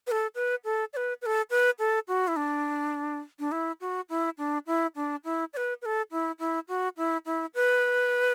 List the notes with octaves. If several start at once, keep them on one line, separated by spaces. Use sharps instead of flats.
B4
A4
B4
A4
D5
B4
B4
A4
B4
A4
F#4
E4
D4
D4
E4
F#4
E4
D4
E4
D4
E4
D5
B4
B4
A4
E4
E4
F#4
E4
E4
B4